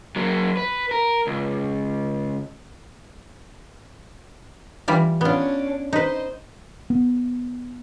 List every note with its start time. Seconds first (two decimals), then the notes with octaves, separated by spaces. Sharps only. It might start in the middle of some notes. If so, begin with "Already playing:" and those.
0.16 F#3 A#3
0.57 B4
0.91 A#4
1.27 C#2
4.88 E3 G3 F4
5.21 B3 C#4 D4 F4
5.93 D#4 B4 C5 D#5
6.90 B3